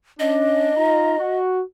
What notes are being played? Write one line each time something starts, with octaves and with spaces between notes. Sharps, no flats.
C#4 D4 D#5
D#4 F4 A#5
F#4